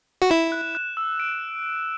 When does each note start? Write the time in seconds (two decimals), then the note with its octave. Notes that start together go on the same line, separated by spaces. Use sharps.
0.22 F#4
0.30 E4 E7
0.52 F#6
0.75 F#6
0.97 E6
1.20 D7